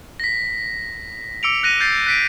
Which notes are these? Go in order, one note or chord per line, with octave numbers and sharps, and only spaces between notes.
A#6 B6
D6 E6 C#7 D7 F7
F#6 A#6 D#7
G6 A6 C7
F#6 B6 D7